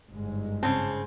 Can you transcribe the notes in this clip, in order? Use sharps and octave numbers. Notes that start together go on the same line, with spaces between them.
G1 G#2 G#3
C#3 C4 A5